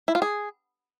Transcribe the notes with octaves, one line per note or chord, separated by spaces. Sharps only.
E4
F4
G#4